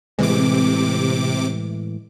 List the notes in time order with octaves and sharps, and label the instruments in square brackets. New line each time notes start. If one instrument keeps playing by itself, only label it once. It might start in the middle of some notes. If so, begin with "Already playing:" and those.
[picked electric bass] A2 E3 G#3 [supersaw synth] C3 D6